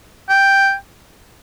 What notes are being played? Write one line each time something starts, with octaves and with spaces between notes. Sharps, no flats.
G5